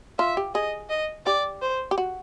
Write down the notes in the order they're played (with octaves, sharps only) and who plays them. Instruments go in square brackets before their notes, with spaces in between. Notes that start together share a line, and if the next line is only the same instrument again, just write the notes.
[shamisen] F4 [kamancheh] E5
[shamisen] G4
[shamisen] G#4 [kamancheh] D#5
[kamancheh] D#5
[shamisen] G4 [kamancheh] D5
[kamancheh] C5
[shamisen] G4
F#4